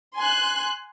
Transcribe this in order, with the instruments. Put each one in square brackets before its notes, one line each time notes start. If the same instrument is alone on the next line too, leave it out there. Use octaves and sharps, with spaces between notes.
[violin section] G#5 C6 F#6